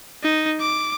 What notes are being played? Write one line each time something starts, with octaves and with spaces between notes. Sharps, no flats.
D#4
D6